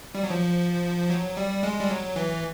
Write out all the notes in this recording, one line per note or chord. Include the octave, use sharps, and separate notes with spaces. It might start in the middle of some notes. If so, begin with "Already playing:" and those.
G3
F#3
F3
F#3
G3
G#3
G3
F#3
E3